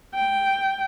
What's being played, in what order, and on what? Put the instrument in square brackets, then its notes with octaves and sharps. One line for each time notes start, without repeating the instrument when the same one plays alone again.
[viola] G5